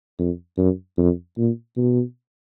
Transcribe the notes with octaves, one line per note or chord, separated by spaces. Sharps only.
F2
F#2
F2
A#2
B2